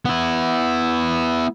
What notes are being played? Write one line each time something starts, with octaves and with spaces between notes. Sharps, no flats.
B3 E4